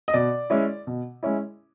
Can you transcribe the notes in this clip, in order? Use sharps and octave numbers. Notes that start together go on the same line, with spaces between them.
D#5
B2 D5
G#3 C#4 E4
B2
G#3 C#4 E4